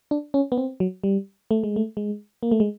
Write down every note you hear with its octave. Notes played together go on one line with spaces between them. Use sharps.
D4
C#4
B3
C4
F#3
G3
A3
G#3
A3
G#3
A#3
A3
G#3